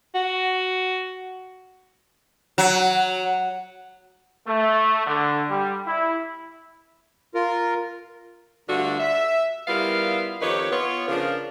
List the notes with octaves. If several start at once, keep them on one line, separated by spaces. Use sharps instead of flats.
F#4
F#3
A3
D3
G3
E4
F4 A#4
G2 D3 A3 F4 F#4
E5
G3 B3 E4 F4 A#4 F5
F2 D#3 G4 B4 C#5
B3 F4 C#5
C#3 F3 D4 A#4